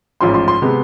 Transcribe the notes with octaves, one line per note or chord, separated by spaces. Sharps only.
A1 G#2 F3 C6
C6
C6
C3 G#3 B3